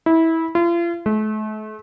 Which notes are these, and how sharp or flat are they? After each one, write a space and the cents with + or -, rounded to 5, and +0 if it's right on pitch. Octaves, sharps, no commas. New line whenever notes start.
E4 -20
F4 -40
A3 -40